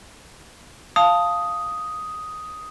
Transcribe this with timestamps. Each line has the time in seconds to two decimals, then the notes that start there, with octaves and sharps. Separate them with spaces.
0.96 F5 A5 D#6